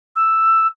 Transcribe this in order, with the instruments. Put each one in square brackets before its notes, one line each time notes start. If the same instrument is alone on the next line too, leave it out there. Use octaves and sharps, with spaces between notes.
[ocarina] E6